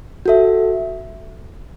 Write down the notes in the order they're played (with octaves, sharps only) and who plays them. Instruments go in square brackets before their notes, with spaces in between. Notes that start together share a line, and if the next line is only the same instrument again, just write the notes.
[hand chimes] F#4 A4 E5